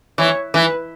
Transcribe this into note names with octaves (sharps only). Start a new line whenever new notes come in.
E3 C#5
E3 B4